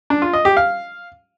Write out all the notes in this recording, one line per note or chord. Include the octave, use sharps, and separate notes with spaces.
D4
F4
D#5
G4
F5